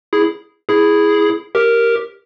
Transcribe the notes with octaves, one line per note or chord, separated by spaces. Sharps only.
E4 G#4
E4 G#4
G4 A#4